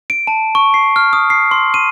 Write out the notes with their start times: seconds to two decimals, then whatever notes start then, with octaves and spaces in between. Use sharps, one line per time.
0.10 D7
0.27 A5
0.55 C#6
0.74 C7
0.96 F6
1.13 D#6
1.30 C7
1.51 C6
1.74 D#7